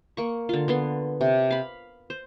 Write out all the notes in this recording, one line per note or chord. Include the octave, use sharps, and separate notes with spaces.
A#3 C#6
D3 F4
D3 B3 C6
C3
F5 B5
C5